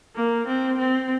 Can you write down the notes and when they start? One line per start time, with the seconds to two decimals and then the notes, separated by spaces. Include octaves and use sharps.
0.16 A#3
0.47 C4
0.78 C4